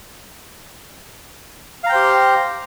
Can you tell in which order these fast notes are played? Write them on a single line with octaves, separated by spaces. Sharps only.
F5 A#5 G5 C5 G4